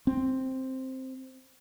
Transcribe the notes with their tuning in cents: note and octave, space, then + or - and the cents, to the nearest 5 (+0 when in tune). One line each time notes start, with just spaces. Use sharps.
C4 +5